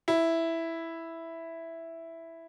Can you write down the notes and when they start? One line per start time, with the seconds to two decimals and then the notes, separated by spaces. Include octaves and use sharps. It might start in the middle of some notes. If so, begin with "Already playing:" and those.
0.08 E4